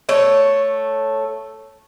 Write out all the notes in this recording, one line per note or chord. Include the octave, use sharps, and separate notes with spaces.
A3 C#5